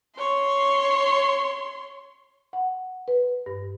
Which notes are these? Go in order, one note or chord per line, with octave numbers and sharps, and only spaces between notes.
C#5 C6
F#5
B4
G2